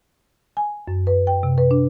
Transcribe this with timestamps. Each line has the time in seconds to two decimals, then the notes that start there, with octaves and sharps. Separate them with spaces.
0.57 G#5
0.88 F#2
1.07 B4
1.27 G5
1.43 C3
1.58 B4
1.71 D4